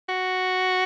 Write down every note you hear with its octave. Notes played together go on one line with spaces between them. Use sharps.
F#4